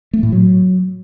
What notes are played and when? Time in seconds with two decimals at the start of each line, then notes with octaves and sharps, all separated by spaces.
0.13 A3
0.23 A2
0.32 F#3